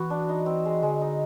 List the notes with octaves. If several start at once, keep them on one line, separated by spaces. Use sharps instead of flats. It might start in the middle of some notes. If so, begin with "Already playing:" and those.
Already playing: E3 B3 F#4
D4
D#4
C4
G#3
D3 G#3
D#4